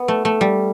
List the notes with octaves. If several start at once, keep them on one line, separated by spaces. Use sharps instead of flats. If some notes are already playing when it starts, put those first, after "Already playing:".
Already playing: B3
A3
A3
G3